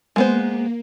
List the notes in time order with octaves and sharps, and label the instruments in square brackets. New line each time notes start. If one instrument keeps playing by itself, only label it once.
[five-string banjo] G#3 B3 C5 [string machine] A#3